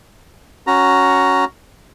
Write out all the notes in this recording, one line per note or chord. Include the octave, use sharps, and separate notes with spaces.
C#4 F#4 A#5